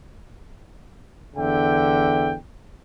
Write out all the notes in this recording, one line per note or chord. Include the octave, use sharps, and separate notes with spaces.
E2 D3 E5 G5